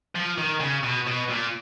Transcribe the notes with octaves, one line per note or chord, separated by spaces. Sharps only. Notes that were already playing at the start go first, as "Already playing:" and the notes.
F3
D#3
C#3
B2
B2
A#2